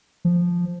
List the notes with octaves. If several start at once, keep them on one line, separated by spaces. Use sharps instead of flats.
F3